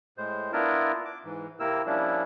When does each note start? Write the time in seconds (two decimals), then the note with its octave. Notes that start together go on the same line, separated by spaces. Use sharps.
0.18 A2 G#3 C5
0.53 B3 D4 E4 F4 A#4
1.05 D6
1.24 G#2 E3
1.60 C3 A#3 C4 E4 A#4 E6
1.86 F3 G3 A#3 C#4 D4 E4